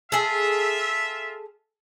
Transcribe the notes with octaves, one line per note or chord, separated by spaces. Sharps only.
F4 G#4 A4 E5